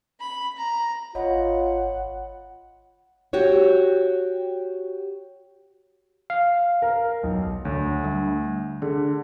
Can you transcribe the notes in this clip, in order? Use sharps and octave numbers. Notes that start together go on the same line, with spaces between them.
B5
A#5
G#1 F4 C#5 D#5 F#5 B5
F#4 G4 C#5
F5
A#4
B1
D2 C#5
G3 A3 D4
D3 G#4